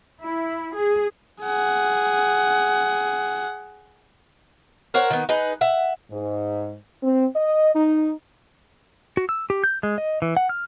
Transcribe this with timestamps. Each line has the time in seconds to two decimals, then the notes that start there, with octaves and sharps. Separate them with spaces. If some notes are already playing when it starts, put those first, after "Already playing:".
0.22 E4
0.74 G#4
1.42 G#4 F#5
4.94 A#4 C5 C#5 F#5
5.10 D#3 B3
5.29 D#4 G#4 B4
5.61 E5 F#5
6.11 G#2
7.02 C4
7.35 D#5
7.74 D#4
9.17 F#4
9.29 E6
9.50 G4
9.64 G6
9.83 G#3
9.98 D#5
10.22 E3
10.37 F#5
10.49 F6